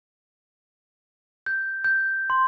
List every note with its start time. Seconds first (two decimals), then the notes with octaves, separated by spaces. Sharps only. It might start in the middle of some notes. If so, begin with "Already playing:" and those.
1.46 G6
1.84 G6
2.30 C6